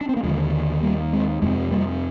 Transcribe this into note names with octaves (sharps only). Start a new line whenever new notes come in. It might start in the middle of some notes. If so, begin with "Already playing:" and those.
D4
C4
A#3
D#2 D3 F3 G#3
G3 A#3
G#3 C4
F2 C3 G#3 C4
G#3
G3 A#3